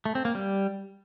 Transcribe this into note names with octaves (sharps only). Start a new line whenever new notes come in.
A3
C4
A#3
G3